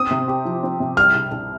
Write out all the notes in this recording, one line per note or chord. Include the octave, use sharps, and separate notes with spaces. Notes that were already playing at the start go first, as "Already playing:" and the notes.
Already playing: C4 D#6
C3
G4
F3
C4
C3
G3 F6
C2
C2